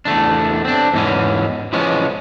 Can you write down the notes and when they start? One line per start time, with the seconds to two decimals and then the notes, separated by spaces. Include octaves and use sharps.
0.05 E2 A3 D4
0.65 C4 D4
0.94 E2 G#2 E3 C#4
1.73 E3 F3 G#3 B3 C#4